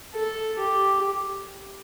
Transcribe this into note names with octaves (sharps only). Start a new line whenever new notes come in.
A4
G4